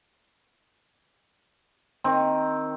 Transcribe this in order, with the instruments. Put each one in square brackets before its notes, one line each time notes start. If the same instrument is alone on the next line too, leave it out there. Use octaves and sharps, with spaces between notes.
[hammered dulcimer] D#3 C4